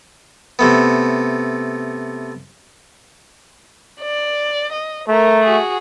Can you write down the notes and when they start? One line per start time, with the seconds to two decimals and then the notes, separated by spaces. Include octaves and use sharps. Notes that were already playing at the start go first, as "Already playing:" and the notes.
0.59 C3 A3 B3
4.00 D5
4.73 D#5
5.09 A3 A#4
5.44 F#4 G#4